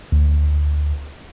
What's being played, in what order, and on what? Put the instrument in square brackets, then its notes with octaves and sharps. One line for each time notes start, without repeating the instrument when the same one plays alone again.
[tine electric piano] D2